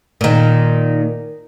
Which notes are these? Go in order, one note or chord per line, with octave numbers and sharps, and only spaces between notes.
A#2 D#3